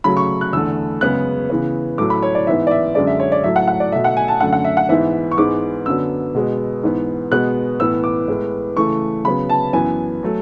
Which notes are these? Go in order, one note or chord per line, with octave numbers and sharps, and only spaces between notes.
C#3 F#3 A3 B5
C#6
F#6
E2 D3 A3 E6
F#2 C#3 G#3 B3 F#6
C#3 E3 B3
A2 F#3 A3 D6
B5
C#5
D5
G#2 E3 B3 E5
D5
E5
F#2 D3 G#3 D5
E5
C#5
D5
A2 F#3 A3 E5
F#5
F#5
D5
B2 A3 E5
F#5
G#5
A5
F#2 D3 A3 F#5
F#5
E5
F#5
G#2 E3 B3 E5
C#6
G#2 E3 G#3 B3 D6
F#2 D3 F#3 B3 E6
B2 G#3 B3
G#2 E3 B3
B2 G#3 B3 F#6
A2 E3 B3 E6
D6
A2 G#3 B3
C#3 E3 A3 C#6
C#3 F#3 B3 B5
A5
F#2 E3 B3 G#5
F#3 A3